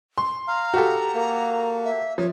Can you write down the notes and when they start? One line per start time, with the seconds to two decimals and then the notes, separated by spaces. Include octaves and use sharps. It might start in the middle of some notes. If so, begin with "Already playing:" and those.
0.18 C6
0.48 F5 A#5
0.74 F#4 G4 A4
1.15 A#3
1.85 E5
2.18 F3 C#5